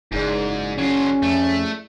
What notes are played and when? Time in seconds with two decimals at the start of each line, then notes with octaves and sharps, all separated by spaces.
0.12 F#1 G#2 E4 G#4 D5
0.78 F#3 C#4 F4
1.22 F2 A3